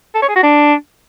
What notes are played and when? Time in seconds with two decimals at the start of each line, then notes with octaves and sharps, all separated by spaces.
0.15 A4
0.22 C#5
0.29 G#4
0.36 F#4
0.43 D4